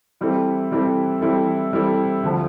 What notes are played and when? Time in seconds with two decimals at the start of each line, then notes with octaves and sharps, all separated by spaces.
0.21 E3 G3 C4 E4 A4
0.71 E3 G3 C4 E4 A4
1.21 E3 G3 C4 E4 A4
1.73 E3 G3 C4 E4 A4
2.23 D2 D3 F3